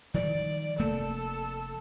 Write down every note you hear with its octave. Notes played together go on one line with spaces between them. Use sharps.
D#3 F3 G3 D5
F1 A3 A#3 A4